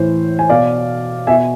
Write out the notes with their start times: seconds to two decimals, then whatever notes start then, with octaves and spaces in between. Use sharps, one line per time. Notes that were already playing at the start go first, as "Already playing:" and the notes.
Already playing: A2 E3 C5
0.39 G#5
0.50 B2 D5 F5
1.27 B2 E5 G#5